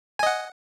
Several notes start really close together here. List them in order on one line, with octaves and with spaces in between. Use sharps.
G#5 D#5 F#5